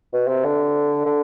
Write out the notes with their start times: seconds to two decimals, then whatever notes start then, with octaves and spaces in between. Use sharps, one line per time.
0.13 B2
0.27 C3
0.44 D3
1.05 D3